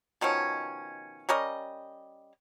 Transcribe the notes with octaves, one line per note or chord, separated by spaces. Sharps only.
B2 D#3 F3 C#4
G3 C#4 A#4 D#5